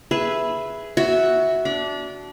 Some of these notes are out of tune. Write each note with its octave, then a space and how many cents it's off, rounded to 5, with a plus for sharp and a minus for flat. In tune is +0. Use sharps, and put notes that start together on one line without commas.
G#4 +0 B4 +0 E5 +0
F#4 +5 E5 -10
D4 -20 B5 -40